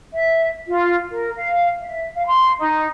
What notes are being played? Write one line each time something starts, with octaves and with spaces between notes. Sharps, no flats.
E5
F4
A#4
F5
E5
F5
C6
D#4